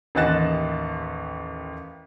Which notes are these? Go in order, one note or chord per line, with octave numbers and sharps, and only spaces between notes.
A1 D#2 D#5 F#6 A6 E7